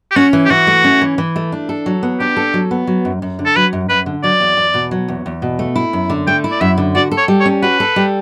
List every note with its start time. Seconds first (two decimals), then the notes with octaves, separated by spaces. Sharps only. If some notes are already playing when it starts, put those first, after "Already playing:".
0.11 G4
0.16 C#4 F#4
0.33 E3
0.45 G4
0.50 E3 F#4
0.67 A3
0.84 C#4
1.01 E3
1.18 E3
1.36 A3
1.52 D4
1.69 A4
1.86 F#3
2.03 B3
2.20 D4 G4
2.37 A4
2.54 F#3
2.71 B3
2.87 F#3
3.05 F#2
3.22 F#2
3.39 D3
3.45 A4
3.56 F#3 B4
3.73 F#2
3.90 F#2 B4
4.06 D3
4.23 F#3 D5
4.40 E2
4.57 E2
4.74 B2
4.91 F#3
5.08 E2
5.26 E2
5.42 B2
5.59 A3
5.76 E4
5.93 F#2
6.10 D3
6.27 A3 G5
6.44 E4
6.51 D5
6.61 F#2 E5
6.78 D3
6.95 F#4 D5
7.12 A4
7.17 C#5
7.28 G3
7.40 C#5
7.46 C#4
7.62 F#4 B4
7.80 A4
7.96 G3